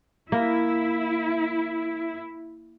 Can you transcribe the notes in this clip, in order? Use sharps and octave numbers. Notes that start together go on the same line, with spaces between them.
A#3 E4